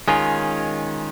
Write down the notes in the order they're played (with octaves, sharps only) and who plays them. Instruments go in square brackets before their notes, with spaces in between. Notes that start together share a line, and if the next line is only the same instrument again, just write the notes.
[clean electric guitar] D#3 G#3 C#4 F4 [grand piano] G#5